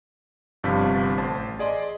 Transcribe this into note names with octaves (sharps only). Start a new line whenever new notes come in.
G1 G2 C3 F3 F5 B6
A1 C5 A5
G#4 D5 D#5 C6